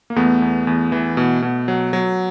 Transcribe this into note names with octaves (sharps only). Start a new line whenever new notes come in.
A#3
E2 A3 B3
E2
E2
E3
B2
B2
F#3
F#3